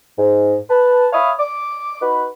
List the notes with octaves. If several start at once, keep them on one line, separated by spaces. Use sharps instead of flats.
G#2
B4 A5
C#5 E5 F5 B5 D#6
D6
D#4 F#4 B4